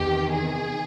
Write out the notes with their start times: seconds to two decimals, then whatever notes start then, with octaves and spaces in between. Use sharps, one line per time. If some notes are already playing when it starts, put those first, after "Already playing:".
Already playing: E2 C3 D#3 G4
0.30 G#4